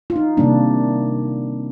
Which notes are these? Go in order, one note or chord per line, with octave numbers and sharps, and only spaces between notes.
F4
D#4
C3 D#3 G3 A#3 D4